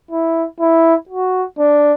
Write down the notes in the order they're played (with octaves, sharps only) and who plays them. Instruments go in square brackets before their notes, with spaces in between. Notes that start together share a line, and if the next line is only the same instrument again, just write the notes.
[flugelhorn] E4
E4
F#4
D4